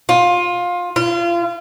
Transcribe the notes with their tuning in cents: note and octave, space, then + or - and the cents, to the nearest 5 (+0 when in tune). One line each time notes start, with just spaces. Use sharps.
F4 +20
F4 -30